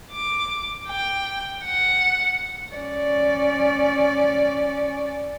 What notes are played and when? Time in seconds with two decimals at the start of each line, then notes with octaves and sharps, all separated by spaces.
0.12 D6
0.88 G5
1.64 F#5
2.74 C#4 D5